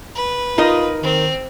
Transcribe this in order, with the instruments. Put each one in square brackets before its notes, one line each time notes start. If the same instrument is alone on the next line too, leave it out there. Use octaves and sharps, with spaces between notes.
[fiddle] B4
[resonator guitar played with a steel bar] D#4 A#4 D#5 [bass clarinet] F4
[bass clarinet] D#3 [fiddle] C4